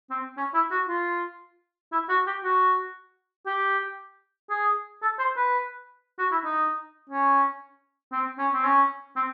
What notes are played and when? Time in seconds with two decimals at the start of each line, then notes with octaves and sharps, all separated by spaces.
0.10 C4
0.37 C#4
0.54 E4
0.71 F#4
0.88 F4
1.92 E4
2.09 F#4
2.26 G4
2.44 F#4
3.46 G4
4.50 G#4
5.02 A4
5.19 C5
5.36 B4
6.18 F#4
6.31 E4
6.44 D#4
7.10 C#4
8.12 C4
8.38 C#4
8.54 C4
8.64 C#4
9.16 C4